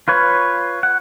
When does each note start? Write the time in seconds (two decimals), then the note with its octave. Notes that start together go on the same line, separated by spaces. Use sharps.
0.08 F4 B4 C#5
0.83 F#5